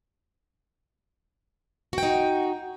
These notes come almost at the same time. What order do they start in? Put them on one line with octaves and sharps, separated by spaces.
F#4 G5 D#4